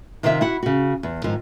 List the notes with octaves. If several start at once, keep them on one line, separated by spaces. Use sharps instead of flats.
C3 D#3 F4 C5 C#5 E5
E4 F#4 F#5
C#3 F#4
E2
G#2 D#3 F3